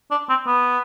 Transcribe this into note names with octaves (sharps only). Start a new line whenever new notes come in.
D4
C4
B3